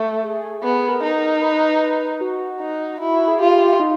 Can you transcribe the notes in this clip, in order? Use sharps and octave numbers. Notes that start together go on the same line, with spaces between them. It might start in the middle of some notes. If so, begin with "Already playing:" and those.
Already playing: A3
G#4
B3 G#4
A#4
D#4
A#4
B4
F#4
D#4
E4 F#4
G#4
F4 G4
D#4